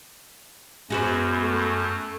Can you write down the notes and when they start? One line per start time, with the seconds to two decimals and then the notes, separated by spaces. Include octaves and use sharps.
0.90 F#2 G#3 B3 F#4 D#5
1.42 A3